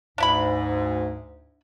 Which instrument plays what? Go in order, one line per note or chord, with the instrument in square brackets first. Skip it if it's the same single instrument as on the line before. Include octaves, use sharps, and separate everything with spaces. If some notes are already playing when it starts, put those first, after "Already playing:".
[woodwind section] D2 G#2 [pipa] D4 E4 B5